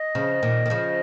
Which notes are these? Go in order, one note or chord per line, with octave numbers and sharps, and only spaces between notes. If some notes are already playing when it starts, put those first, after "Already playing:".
Already playing: D#5
C#3 F3
A#2 D#3
D#3
C#3 F3